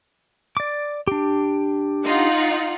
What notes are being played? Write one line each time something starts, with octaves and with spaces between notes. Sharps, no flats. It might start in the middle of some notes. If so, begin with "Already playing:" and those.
D5 D6
D4 G4
D#4 F4 F#5